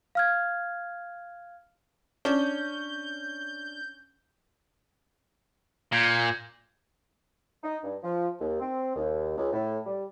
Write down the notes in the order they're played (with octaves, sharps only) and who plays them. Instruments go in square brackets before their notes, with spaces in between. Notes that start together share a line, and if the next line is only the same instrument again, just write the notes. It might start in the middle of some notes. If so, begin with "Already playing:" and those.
[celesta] F5 F6 G#6
[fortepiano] C#4 [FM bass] D4 [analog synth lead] G6
[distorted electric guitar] A#2 [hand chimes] G6 G#6 A#6
[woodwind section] D#4
G2
F3
D#2
C4
D#2
C#2
A2
G3